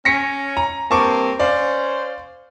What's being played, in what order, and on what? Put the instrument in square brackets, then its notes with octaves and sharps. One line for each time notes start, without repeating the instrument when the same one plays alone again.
[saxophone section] C#4 [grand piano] A#6 B6 C#7
[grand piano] A#5
[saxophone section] G2 A#3 C4 [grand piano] A5 C#6 D6
[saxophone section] C#4 C5 [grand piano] D5 F5